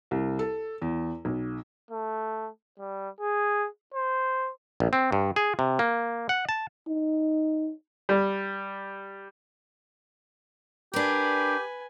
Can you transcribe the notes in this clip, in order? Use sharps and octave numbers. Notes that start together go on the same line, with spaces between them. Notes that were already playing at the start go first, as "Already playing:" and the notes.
C2
A4
E2
B1
A3
G3
G#4
C5
A#1
C4
G2
G#4
C3
A#3
F#5
A5
D#4
G3
D4 G4 A#4 B4 G#5